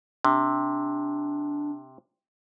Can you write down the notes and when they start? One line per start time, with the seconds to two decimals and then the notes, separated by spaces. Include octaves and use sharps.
0.25 C3 D4